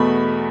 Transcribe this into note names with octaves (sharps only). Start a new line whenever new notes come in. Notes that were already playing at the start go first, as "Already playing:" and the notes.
Already playing: E2 B2 A3 B5